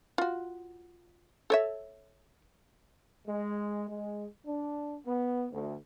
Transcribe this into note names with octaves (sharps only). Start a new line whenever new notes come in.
F4 F#4
A4 C#5 E5
G#3
G#3
D4
B3
D2